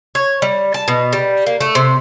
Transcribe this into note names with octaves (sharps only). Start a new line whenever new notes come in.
C#5
G3
A5
B2
G3
A#3
A3
C3